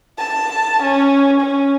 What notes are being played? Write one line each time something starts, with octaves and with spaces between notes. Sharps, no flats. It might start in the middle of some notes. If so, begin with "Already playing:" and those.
A5
C#4
C#4